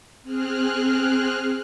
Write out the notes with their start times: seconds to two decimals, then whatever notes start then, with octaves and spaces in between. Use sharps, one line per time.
0.23 C4 G#4 F6 F#6